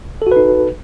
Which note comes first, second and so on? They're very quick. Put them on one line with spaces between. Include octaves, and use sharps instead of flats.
A4 F#4 B4 D#4